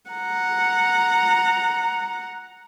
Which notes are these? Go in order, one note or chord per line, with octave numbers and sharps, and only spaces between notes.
F#5 A#5